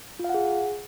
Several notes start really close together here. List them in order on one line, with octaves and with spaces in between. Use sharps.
F4 F5 F#5 G#4